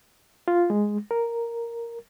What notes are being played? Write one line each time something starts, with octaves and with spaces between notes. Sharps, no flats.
F4
G#3
A#4